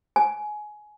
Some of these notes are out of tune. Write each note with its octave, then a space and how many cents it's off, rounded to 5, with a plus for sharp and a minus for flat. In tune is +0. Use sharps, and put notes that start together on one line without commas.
G#5 +20